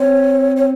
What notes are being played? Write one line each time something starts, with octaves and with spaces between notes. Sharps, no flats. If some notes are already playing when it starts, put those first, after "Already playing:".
Already playing: C4 C#5
C#5